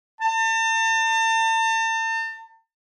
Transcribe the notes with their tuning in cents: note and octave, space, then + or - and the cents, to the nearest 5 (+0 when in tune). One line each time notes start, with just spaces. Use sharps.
A5 +35